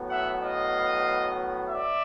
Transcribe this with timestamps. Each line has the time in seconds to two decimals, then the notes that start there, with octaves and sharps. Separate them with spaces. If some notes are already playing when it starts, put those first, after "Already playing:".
Already playing: A2 F#3 B3
0.09 E5 F#5
0.42 D#5 F5
1.70 D5 E5